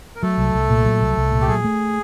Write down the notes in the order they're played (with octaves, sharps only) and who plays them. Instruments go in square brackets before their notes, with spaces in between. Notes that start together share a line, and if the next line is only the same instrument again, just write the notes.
[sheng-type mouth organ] A#4
[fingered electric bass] F#3 [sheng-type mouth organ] A3 A4
[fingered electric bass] C2
C2
A#2
F#3
C2
C2
A#2
[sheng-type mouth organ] G4
[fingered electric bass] F#3 [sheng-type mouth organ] G#4
[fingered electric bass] A3